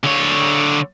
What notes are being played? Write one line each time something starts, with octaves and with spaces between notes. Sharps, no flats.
D3 C#5